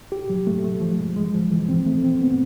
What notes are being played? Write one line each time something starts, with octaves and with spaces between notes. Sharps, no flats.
G4
F#3
A3
A3
F3
G#3
G#3
F3
E3
C4
A3
C4
B3